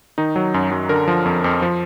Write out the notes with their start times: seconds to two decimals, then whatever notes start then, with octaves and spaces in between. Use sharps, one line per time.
0.18 D#3 D#4
0.36 F#3
0.54 F#2
0.71 F#2
0.89 D3 A#4
1.08 F3
1.26 F2
1.44 F2
1.62 F3